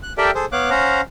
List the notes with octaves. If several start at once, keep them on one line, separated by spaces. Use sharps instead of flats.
F#6
G4 A4 A#4 D5 E5 G5
G#4 A4 C5
B3 C#5 F5 D6 F#6
C#4 C5 F5 F#5 A#5